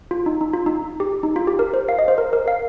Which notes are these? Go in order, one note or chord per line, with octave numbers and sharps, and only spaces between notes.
F4
D#4
D#4
F4
D#4
G4
D#4
F4
G4
A#4
C5
F5
D#5
C5
A#4
A#4
F5